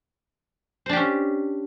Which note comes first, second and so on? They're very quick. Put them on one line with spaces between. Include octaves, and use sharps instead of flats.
C5 D4 G4 C#4